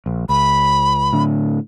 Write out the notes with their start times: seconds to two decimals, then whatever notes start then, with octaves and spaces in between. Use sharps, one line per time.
0.06 A#1
0.29 C#2 B5
1.13 A2 D3